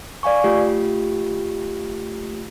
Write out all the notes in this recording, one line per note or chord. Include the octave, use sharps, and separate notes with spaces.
D5 F5 G#5 C#6
A3 F4 G4